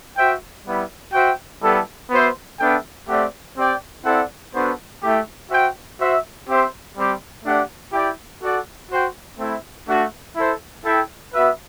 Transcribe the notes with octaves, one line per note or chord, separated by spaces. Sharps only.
F#4 C5 E5 G5
G3 B3 E4
F#4 C5 E5 G5
G3 B3 E4 A4
B3 F#4 C5 E5
B3 D4 A4 E5 G5
A3 C4 G4 D5 F#5
C4 G4 D5 G5
C4 E4 A4 D5 F#5
B3 D4 F#4 A4 C5
A3 E4 G4
F#4 C5 E5 G5
F#4 C5 E5
C4 G4 C5 E5
G3 C4 G4
A3 D4 G4 D5 F#5
E4 G4 D5 G5
F#4 A4 D5 F#5
F#4 C5 G5
A3 C4 E4
A3 D4 F#4
E4 A4 C5
E4 A4 E5 G5
B3 F#4 B4 E5